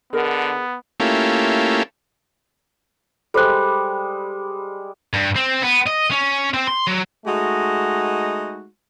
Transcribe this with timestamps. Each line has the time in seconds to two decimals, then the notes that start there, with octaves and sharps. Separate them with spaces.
0.13 D3 B3 G#4 A#4 D#5
1.00 A3 A#3 C#4 E4 F4 G4
3.34 G3 G#3 A4 C5 F#6
5.14 G2
5.36 C4
5.63 B3
5.87 D#5
6.12 C#4
6.54 C4
6.68 C6
6.88 F#3
7.26 G#3 A3 D#4 F#4